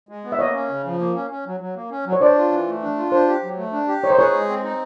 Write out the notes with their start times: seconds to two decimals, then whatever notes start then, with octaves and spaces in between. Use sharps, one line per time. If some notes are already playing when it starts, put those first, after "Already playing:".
0.09 G#3
0.24 B3
0.32 E5
0.39 A#3 C#5 D#5
0.54 C#4
0.69 C#3
0.85 F3
0.99 A#3
1.15 C#4
1.30 C#4
1.46 F#3
1.60 F#3
1.76 A#3
1.91 C#4
2.05 F#3
2.12 C#5
2.21 D4 C5 D5
2.37 F4
2.51 E3
2.67 A3
2.82 D4
2.97 F4
3.12 D4 C5
3.28 G4
3.43 F#3
3.57 A3
3.72 D4
3.88 G4
4.04 D#4 C#5
4.10 C5
4.19 G#4 B4 C#5
4.34 G#3
4.49 C4
4.64 D#4